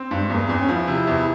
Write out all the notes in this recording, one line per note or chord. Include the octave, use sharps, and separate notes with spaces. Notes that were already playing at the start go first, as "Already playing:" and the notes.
Already playing: C4
G2
G#3
E2 A#3
E2 C4
C#4
F3
E4
C3
E2